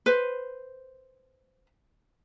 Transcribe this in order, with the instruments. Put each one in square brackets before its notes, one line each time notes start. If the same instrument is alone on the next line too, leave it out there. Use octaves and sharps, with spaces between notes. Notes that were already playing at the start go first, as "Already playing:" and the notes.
[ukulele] B4 C5